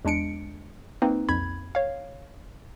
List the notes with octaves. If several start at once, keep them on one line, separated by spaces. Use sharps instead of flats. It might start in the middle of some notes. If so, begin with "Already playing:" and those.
E2 G#3 D4 C#7 D7
A#3 C4 D#4 B4
B1 F2 B5 G#6
C#5 F5